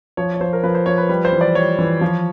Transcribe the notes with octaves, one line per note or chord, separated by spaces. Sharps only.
F3 C#5
C#5
F3 C5
A#4
F3 B4
C5
F3 C#5
B4
G3 B4
C5
E3
D5
G3 C#5
E3
F3